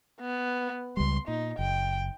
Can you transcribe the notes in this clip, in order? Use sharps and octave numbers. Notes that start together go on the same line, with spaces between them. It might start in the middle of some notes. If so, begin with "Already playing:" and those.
B3
C#2 G3 C6
A#2 D#4
F#1 G5